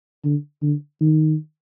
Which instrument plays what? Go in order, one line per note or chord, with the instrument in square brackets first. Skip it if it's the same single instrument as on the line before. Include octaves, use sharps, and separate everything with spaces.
[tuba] D3
D3
D#3